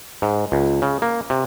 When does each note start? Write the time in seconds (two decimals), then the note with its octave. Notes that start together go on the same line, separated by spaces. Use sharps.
0.22 G#2
0.52 C#2
0.82 C#3
1.02 A#3
1.30 C3